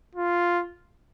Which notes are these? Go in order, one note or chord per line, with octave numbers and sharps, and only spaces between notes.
F4